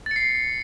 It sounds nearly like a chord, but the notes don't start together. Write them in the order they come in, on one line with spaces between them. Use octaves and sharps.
A6 C#7 C7